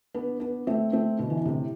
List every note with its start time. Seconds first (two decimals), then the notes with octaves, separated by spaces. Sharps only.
0.14 B3 D4
0.40 B3 D4
0.67 A3 C4
0.92 A3 C4
1.19 B2 D3
1.30 E3
1.37 D3
1.46 A2 C3